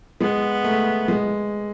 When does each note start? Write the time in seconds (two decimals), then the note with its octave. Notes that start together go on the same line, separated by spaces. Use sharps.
0.21 G#3 B3
0.64 A3
1.08 G#3